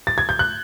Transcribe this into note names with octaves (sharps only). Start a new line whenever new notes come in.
A6
G#6
G6
F#6